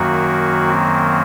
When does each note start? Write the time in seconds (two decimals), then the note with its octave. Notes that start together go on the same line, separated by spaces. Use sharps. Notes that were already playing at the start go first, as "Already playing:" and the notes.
Already playing: F#2 D#3 F#3 A#3 F#4
0.67 C4